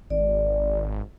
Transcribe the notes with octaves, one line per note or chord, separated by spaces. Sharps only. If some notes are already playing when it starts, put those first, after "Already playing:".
G#1 D5